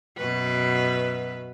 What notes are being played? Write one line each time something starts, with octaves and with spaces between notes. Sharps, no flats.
F#2 B2 B4